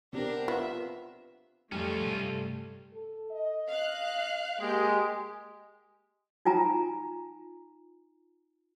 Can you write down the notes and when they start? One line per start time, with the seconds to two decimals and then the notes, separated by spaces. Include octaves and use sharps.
0.13 B3 C4 D4 G4 A#4
0.48 B3 F4 E5
1.72 F2 G3 A3 C#4 F4
2.01 G2 C3
2.94 A4
3.32 D#5
3.68 F5 F#6
4.60 G#3 A#3 G4
6.45 D#4 F4 G#5 A#5 B5